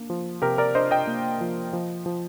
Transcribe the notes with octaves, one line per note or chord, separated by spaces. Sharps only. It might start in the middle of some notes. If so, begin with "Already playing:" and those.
Already playing: A#3 D4
F3
C3 G4 A#4
A#4 D5
D4 C5 D#5
D#5 G5
A#3
F3
F3
F3